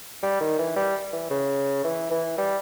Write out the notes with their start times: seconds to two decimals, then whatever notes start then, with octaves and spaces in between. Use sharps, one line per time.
0.23 G3
0.41 D#3
0.59 E3
0.76 G3
1.13 E3
1.30 C#3
1.84 E3
2.11 E3
2.38 G3